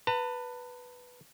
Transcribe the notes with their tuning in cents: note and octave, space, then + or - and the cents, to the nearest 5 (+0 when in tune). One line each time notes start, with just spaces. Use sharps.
B4 +0 A5 +40